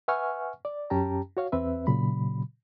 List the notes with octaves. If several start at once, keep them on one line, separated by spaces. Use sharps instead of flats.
B4 E5 F#5 G#5 C#6 F6
D5
F#2 C#4 G4 G5 A5 A#5
F#4 C#5 F5
E2 C4 B4 E5
A#2 C#3 F#3 B5